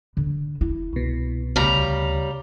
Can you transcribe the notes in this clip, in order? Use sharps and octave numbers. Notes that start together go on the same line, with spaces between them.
D3
E4
C2 B2
D2 C#3 G3 A#5